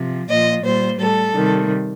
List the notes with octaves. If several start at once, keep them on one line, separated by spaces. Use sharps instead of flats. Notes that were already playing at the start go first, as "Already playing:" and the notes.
Already playing: C3 F3
A#2 F3 D#5
A#2 G3 C5
A2 G3 A4
C3 D#3 G3